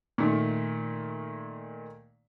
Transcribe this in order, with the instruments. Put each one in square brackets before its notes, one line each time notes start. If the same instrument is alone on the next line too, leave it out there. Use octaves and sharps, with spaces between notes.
[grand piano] A#2 D#3 A3